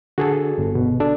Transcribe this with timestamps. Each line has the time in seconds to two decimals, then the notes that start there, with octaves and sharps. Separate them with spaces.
0.18 D3 F#4 G#4 A4
0.58 G1
0.75 B2
1.00 D4 A4